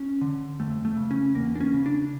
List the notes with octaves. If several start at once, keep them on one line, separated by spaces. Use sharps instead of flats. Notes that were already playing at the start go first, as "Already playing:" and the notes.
Already playing: C#4
D3
F2 A3
A3
C#3
C#4
E2 A#3
D4
C#4
C#3
D4